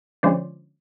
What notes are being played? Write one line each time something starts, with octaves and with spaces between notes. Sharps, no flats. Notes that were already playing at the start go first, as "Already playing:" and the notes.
D3 F3 G#3 C#4 C5 D5